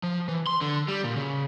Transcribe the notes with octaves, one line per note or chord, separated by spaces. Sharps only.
F3
E3
C6
D3
G3
A#2
C#3